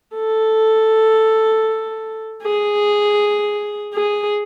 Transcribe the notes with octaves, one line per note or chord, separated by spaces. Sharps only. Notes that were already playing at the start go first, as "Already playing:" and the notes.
A4
G#4
G#4